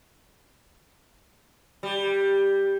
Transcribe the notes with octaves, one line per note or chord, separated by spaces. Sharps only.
G3